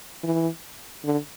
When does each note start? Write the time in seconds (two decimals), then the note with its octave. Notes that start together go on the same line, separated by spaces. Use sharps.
0.24 E3
1.04 D3